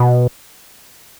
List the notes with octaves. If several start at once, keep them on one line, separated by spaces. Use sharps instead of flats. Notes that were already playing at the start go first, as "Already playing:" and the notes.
Already playing: B2